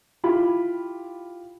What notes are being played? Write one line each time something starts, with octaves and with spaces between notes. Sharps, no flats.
E4 F4 G4 B5